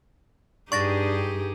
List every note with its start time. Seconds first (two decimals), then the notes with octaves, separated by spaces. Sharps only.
0.72 G2 D4 D#4 G4 G#4 C#6 A6 A#6